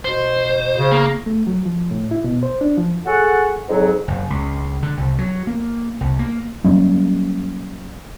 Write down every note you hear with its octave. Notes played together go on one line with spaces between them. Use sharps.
B2 C5
C#3
A#3
A3
F#3
F3
A2
E4
B2
C5
D4
F3
F#4 G#4 A4 F#5
F2 G#2 F#3
F#1
C#2
D3
C2
F#3
A#3
C2
A#3
F#3 G3 A#3 C#4